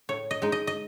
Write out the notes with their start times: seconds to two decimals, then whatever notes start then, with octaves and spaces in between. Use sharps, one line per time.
0.09 A2 C#5
0.31 D#5
0.42 G#3 D#4
0.52 D#5
0.67 D#5